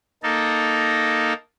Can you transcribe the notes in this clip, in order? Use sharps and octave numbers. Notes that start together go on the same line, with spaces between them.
A#3 D#4 A4